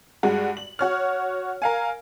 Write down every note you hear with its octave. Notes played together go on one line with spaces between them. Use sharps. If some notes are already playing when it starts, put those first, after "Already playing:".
G2 G#3 F#4
F#7
F#4 C#5 F6
A#4 F5 G#5